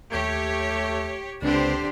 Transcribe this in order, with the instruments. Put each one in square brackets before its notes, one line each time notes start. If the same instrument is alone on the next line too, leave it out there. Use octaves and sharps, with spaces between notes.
[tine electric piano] D#2 G6 G#6 [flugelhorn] A3 [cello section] G4 C#5
[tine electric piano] C#2 C4 B4 [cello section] D3 G4 C5 [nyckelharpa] D4